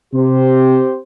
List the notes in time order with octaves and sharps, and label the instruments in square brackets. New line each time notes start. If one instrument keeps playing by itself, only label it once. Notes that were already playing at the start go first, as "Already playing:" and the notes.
[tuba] C3 [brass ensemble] C4 G4 C5